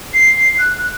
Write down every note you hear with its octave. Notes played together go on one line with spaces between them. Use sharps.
C7
F#6
F#6